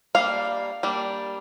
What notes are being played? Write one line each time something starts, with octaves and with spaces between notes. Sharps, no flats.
G3 A#3 D4 F5
G3 A#3 D4